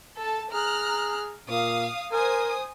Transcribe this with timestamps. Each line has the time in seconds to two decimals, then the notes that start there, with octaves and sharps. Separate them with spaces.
0.19 A4 A5
0.53 G#4 A#5 F6 F#6
1.49 A#2 F5 D#6
2.12 A#4 C5 G#5 D#6